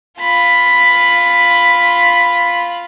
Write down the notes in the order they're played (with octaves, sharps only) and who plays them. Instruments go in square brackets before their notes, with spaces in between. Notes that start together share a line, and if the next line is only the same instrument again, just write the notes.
[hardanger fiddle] F4 B5